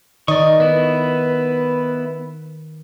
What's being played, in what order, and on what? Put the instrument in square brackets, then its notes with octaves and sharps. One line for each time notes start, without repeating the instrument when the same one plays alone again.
[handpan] D#3 [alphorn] D#4 [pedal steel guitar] D5 C#6 [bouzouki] D#5
[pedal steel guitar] B3 E4 [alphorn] B4